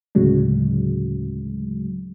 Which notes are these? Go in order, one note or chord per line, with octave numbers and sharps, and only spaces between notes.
D2 A2 C#3 F#3 G#3